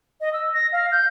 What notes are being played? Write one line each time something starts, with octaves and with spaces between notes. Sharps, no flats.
D#5
E6
A#6
F5
G6